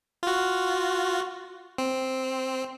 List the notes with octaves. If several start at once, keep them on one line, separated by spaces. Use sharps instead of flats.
F4 F#4
C4